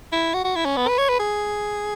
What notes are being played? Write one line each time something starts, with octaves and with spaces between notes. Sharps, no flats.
E4
F#4
F#4
E4
C#4
B3
B4
C#5
B4
G#4